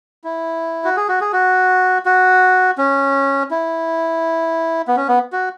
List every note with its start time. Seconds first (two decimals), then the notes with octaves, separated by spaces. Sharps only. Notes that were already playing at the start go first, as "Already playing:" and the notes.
0.24 E4
0.84 F#4
0.97 G#4
1.09 F#4
1.21 G#4
1.33 F#4
2.06 F#4
2.78 C#4
3.51 E4
4.88 B3
4.96 C#4
5.08 B3
5.33 F#4